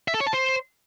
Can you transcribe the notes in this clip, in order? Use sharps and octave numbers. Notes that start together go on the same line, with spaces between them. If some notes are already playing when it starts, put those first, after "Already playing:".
E5
A4
C#5
A5
C5